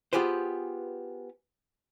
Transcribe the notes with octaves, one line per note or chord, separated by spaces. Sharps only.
B3 F4 G4 G#4 B4 C5